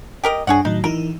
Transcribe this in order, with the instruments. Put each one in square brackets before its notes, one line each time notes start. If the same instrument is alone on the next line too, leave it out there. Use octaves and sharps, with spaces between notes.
[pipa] G4 A#4 D#5
[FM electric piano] G2 D4 [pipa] G#4 C#5 F#5
[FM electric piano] A2 D#3 F#3 [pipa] D#4
[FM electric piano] E3 D#4 E4 [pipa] A#4